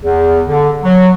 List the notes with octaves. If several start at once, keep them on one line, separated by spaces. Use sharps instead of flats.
E2
D3
F#3